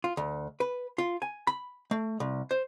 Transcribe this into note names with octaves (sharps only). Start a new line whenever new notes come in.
F4
D2
B4
F4
G#5
B5
A3
C2
C5